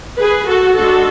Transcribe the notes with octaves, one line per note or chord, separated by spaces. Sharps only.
G#4 B4
F#4 A4
G#3 D4 F#4 A4